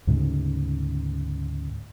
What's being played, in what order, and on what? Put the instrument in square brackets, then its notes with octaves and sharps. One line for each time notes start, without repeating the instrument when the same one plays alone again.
[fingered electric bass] D2 G#2 C#3